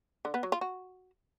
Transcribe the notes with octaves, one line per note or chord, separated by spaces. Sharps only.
D3
B3
F#3
F4
F#4